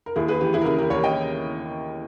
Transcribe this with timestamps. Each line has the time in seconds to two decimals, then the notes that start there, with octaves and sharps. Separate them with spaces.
0.06 A#4
0.16 D#2 E4 G#4
0.28 G#4 B4
0.41 E3 G4
0.53 E4 G#4
0.61 A#4
0.65 C#3 E4 G#4
0.79 G4 A#4
0.90 D#2 A#4 C#5
1.04 D#5 G5